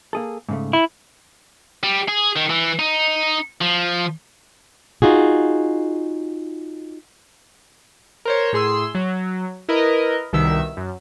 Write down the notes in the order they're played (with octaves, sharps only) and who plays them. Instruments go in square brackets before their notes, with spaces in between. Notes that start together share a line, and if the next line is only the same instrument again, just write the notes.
[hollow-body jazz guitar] A#3 G#4 A4
G#2 C#3 A3
[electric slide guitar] E4
[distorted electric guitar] G3
G#4
D#3
E3
D#4
F3
[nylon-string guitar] D#4 F4 F#4 G#4
[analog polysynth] A#4 C5 C#5
A2 G#4 C6 E6
F#3
E4 A#4 B4 D#5
C2 B2 D#3 E5 E6
F#2